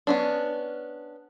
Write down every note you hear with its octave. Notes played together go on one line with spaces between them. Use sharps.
B3 C#4 D4